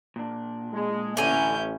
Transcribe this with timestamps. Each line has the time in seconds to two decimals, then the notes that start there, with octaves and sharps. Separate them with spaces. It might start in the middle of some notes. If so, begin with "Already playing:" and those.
0.16 A#2 D4
0.73 G#3
1.17 A1 D3 C#4 E4 G#5 A#5 G6